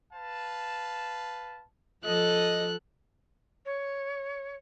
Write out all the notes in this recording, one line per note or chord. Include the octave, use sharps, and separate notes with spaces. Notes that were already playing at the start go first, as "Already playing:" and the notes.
B4 F5 A5
F3 A4 D#5 F#6
C#5